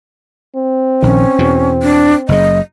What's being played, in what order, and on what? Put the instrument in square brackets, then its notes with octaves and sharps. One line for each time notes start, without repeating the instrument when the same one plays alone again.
[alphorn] C4
[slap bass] A#1 D#3 [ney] C#4
[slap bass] E2 B2
[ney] D4
[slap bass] F#1 C#3 [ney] D#5